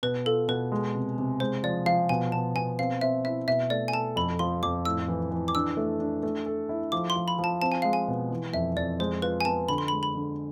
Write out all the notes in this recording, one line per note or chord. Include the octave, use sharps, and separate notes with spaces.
B2 B4
F4 A4
B2 B4
G#3
C3
C3
G#3 C5
F3 D5
F3 F5
B2 G#5
B2 A5
B2 G#5
C4 F5
C4 E5
E4 E5
B2 E5
A3 D5
G#5
A4 A5
F2 B5
F3 C6
F2 D6
A2 E6
E3
E3
D6
D4 E6
A3
D4
A3
A4
E4
F3 D6
C6
F3
B5
F3
A5
C4 A5
G#5
G#3 F5
G#5
B2
E3
F2 E5
F2 D5
G#3 C5
F4 B4
G#5
B3 A5
D3 B5
C6
B5
G#3
B5
D3